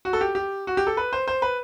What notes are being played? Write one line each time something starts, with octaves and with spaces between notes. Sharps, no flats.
F#4
A4
G4
G4
F#4
G4
A4
B4
C5
C5
B4